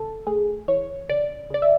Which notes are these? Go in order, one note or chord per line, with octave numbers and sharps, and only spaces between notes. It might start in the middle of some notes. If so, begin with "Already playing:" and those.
Already playing: C#3 A4
A3 G#4
E3 C#5
C#3 D5
C#3 D5
E5